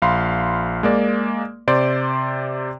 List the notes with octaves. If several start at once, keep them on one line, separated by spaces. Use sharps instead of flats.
A#1 F5 B5 C6
G#3 A#3 D5
C3 C5 D5 C6 D7